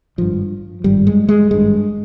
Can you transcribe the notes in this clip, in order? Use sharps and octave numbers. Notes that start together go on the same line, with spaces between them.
G#1 G2 F3
G#1 G2 G3
G#3
G#3
G#1 G2 G#3